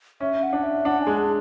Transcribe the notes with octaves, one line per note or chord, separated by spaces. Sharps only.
C#4 E5
F#5
D4
E5
D4 F#5
G#5
G#3
A5